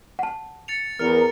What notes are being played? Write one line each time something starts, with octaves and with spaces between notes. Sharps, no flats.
F#5 A5
A6 C#7 F7
E2 A#4 F6 C#7 F7